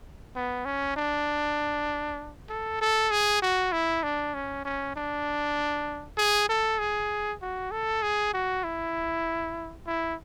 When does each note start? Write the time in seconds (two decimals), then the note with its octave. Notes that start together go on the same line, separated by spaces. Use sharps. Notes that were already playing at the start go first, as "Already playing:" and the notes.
0.36 B3
0.65 C#4
0.97 D4
2.49 A4
2.81 A4
3.11 G#4
3.42 F#4
3.72 E4
4.03 D4
4.34 C#4
4.65 C#4
4.96 D4
6.18 G#4
6.49 A4
6.79 G#4
7.42 F#4
7.71 A4
8.02 G#4
8.34 F#4
8.64 E4
9.87 E4